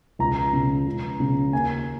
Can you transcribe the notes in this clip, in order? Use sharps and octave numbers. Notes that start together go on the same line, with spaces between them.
C#2 A#5
C#3
C#2
C#3
D#2 G#5